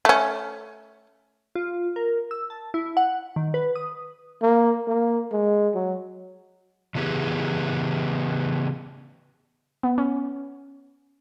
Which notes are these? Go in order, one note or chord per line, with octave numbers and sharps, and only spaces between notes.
A3 C#4
F4
A#4
E6
A5
E4
F#5
D#3
B4
D#6
A#3
A#3
G#3
F#3
C#3 E3 B3 G4 G#4
B3
C#4